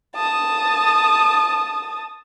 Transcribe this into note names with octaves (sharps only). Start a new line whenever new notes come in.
A5 D#6